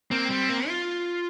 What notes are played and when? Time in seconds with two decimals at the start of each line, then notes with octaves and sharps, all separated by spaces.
0.11 A#3 C4
0.30 G3
0.49 A#3
0.68 F4